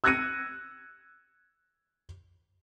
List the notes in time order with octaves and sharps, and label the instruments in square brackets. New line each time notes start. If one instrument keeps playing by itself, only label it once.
[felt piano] E6 F#6 G#6 A#6 C#7 D#7